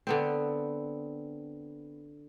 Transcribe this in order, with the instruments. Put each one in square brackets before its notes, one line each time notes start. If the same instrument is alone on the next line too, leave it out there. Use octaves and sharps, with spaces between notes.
[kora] D3 B3 C4